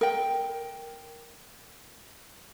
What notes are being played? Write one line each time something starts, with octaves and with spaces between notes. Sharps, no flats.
A#4 G5